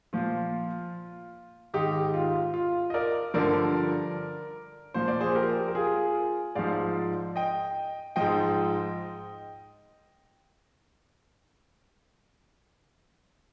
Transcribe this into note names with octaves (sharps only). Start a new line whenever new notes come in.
A#2 F3 F4
G#2 D#3 D#4 G4
F4
F4
D#5
A#4 D5
G2 D3 F3 A#4 D5
A#2 F3 C5
D5
G#4 C5
G4 A#4
A#4
F4 G#4
G#2 F3 D5 F5
D#5 G5
G#2 F3 D#5 G5